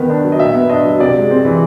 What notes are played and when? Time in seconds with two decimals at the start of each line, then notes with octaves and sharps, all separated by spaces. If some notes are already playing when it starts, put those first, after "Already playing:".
Already playing: D#3 B3
0.10 D4
0.24 F#3
0.32 D#5
0.39 A#2 E5
0.54 B3
0.69 D4 D#5
0.85 F#3
1.00 C3 D5
1.16 G#3
1.30 C4
1.45 E3